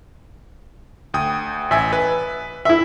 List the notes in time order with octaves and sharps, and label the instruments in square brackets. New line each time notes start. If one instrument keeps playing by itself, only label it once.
[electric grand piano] D2 G5 D#6
[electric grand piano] A1 G#5 [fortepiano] E5
[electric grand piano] B4
[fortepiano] E4 E5